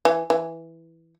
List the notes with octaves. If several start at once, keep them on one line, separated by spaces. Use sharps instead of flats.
E3
E3